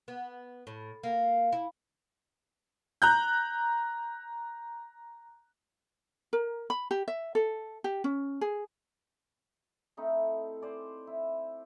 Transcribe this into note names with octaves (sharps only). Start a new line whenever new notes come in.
B3
A2
A#3
E4
A#5 F#6 G6
A#4
B5
G4
E5
A4
G4
C#4
G#4
A3 C4 D#4 E4
C5 D5 G#5
E4